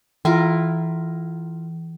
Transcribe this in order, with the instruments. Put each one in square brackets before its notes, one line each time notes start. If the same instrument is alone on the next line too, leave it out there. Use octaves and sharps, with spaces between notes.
[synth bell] E3 [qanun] E4 F4 A#4